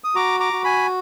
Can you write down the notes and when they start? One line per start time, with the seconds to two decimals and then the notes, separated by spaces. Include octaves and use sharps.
0.04 D#6
0.15 F#4 A#5 D6
0.40 A#5 D6
0.53 F#4
0.64 G#5 B5